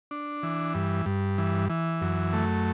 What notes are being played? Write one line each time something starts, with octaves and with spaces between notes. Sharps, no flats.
D4
E3
G2
G2
E3
E3
F#2
A3